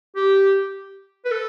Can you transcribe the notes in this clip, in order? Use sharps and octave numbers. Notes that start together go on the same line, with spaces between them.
G4
B4
A4